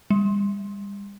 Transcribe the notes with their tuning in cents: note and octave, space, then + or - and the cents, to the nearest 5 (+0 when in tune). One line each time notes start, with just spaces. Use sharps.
G3 +40